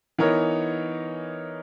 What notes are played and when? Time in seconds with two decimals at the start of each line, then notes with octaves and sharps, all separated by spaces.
0.18 E3 B3 D#4 A#4 C#5